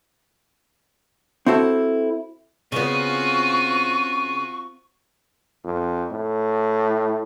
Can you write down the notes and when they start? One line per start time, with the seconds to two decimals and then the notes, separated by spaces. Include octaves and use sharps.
1.46 C4 E4 F#4 A4
2.72 C#3 B3 C4 F4 F#4 C#6 D#7
5.64 F2
6.11 A2